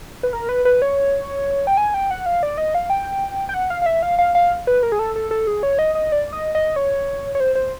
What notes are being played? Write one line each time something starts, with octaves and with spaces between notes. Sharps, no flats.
B4
A#4
B4
B4
C#5
G5
G#5
G5
F#5
F5
D5
D#5
F5
G5
G5
F#5
F5
F5
E5
F5
F5
F5
B4
A#4
G#4
A4
A4
A4
G#4
C#5
D#5
D#5
D5
D#5
D#5
C#5
C#5
C5
C5